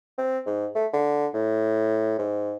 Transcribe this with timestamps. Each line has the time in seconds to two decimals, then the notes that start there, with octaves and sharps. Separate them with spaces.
0.18 C4
0.46 G#2
0.75 A3
0.93 D3
1.34 A2
2.19 G#2